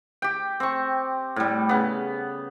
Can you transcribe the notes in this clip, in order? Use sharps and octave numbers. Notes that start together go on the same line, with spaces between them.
G4 G5
C4 C#6
A2 G3
C#3 B3